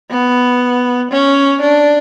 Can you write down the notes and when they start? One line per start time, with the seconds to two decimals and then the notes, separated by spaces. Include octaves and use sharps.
0.10 B3
1.11 C#4
1.61 D4